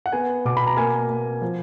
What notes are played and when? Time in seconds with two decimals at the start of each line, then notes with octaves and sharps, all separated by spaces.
0.06 F#5
0.12 B3 G#5
0.45 B2 D6
0.57 B5
0.67 A#5
0.77 A#3 G#5
1.09 A#3
1.42 F3